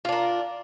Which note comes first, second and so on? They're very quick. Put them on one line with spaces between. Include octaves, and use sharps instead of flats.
F4 D4 A#4